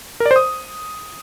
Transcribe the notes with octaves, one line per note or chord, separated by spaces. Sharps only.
A#4
D5
C5
D#6